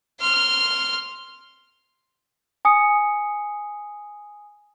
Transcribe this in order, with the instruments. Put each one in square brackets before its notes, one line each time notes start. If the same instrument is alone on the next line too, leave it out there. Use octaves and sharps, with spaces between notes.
[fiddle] C6 F6
[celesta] G#5 D#6 C#7